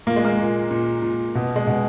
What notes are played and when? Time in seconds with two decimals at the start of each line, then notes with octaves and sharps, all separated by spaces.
0.07 A#2 A#3
0.16 G#3
0.25 A#3
0.39 A#2
0.71 A#2
1.02 A#2
1.35 B2
1.56 G#3
1.67 B2